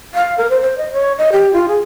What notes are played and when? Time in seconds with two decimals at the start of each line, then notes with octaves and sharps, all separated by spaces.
0.14 F5
0.38 A#4
0.50 C5
0.62 C5
0.78 D#5
0.93 C#5
1.18 D#5
1.32 G4
1.53 F4
1.68 G#4